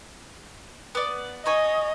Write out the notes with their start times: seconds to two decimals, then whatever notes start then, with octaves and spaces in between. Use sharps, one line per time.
0.95 B3 D5
1.46 D#4 C#5 D#5 G#5